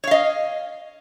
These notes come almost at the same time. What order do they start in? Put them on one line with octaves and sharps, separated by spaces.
C#5 F5 D#5